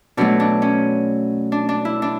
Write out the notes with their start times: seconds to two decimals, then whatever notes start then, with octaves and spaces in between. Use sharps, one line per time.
0.17 B2 F#3 A3 D4
0.40 D4
0.62 C#4
1.52 D4
1.69 D4
1.85 E4
2.02 D4